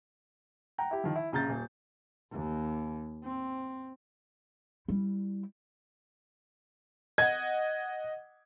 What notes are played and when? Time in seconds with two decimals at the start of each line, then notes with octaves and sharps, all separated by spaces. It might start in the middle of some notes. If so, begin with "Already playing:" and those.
0.78 F#5 G5 A#5
0.91 E4 G4
1.04 D#3 F3
1.16 E4
1.32 A#1 C#3 A#5 G6 A6
1.49 D#1
2.32 D#2
3.24 C4
4.88 G3 E4
7.18 D#5 F#5 G#6